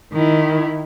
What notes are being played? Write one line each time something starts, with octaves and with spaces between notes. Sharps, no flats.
D#3 E4